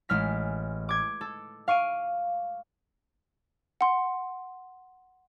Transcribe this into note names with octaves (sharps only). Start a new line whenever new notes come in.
A1 G#3 F6 B6
D6 G#6
A4
F5 C#6 D7 D#7
F#5 C6